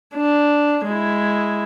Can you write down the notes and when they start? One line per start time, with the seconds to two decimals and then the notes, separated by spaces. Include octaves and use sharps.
0.15 D4
0.85 G#3 E4